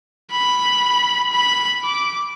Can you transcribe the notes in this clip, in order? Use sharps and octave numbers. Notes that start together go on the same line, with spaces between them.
B5
B5
D6